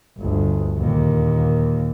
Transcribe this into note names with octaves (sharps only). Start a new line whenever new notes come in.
G1 D2
D#2 A#2